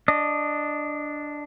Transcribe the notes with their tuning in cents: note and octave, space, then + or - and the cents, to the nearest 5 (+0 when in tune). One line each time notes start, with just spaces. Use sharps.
D4 +0 D#5 -15